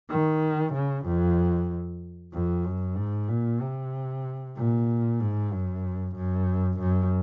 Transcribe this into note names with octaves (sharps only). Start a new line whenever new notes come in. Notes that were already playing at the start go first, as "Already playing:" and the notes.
D#3
C#3
F2
F2
F#2
G#2
A#2
C3
A#2
G#2
F#2
F#2
F#2